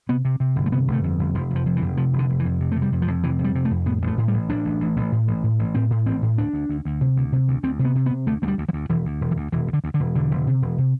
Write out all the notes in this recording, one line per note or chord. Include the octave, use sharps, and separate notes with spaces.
C3 B3
C3
C3
G1
A3
C3 B3
G1
A3
F2
G1
F1 F3
F1
F3
F2
E3
F1
C3 F3
F1
D3
F1
E3
F2
C3
C3 A3
G3
F2
F3
F2
C3 E3
F2
G3
C3
A3
F2
A2 B3
A1
A3
A2
G3
A1
A1 D4
A1
A1
A1
A2
A1
A2
A1
A2 C4
A2
A1 C4
A2
D2 D4
D2
D2
D2
C3
D2
C3
D2
D2 C4
C3
B3
C3
B3
C3
D2 A3
D2 A3
G3
D2
F3
D2
E1 E3
D2
E1
E3
D2
E1 E3
D2
D3
D2
D3
E1
E1 D3
E1
C3
E1
C3